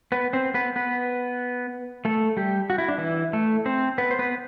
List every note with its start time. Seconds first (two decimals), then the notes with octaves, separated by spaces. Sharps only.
0.12 B3 B4
0.33 C4 C5
0.54 B3 B4
0.76 B3 B4
2.05 A3 A4
2.37 G3 G4
2.70 F#4
2.78 E4
2.88 D4
2.98 E3 E4
3.33 A3 A4
3.66 C4 C5
3.98 B3 B4
4.11 C5
4.19 B3 B4